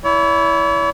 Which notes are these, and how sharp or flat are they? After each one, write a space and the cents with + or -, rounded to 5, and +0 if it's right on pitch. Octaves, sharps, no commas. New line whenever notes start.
E4 +0 C#5 +45